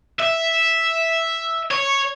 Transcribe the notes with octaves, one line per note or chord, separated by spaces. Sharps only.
E5
C#5